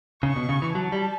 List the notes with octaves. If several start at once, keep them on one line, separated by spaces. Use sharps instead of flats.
C#3 C#6
B2
C#3
E3
F#3 A5
G3